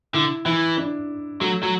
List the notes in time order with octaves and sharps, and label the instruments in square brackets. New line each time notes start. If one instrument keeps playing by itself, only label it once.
[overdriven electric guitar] D3 [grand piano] E4
[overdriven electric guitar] E3 [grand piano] E4
[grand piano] D4
[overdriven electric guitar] F#3 [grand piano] A3
[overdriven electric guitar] F#3